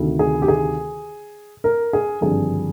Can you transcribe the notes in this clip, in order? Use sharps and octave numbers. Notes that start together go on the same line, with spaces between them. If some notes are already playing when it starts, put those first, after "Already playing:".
Already playing: D2 C3 D#3
G#4
G4
G#4
A#4
G#4
G#1 G2 D3 F3 G#4